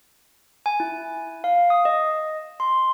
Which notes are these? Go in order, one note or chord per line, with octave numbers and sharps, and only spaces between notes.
G#5
E4
F5
D#6
D#5
C6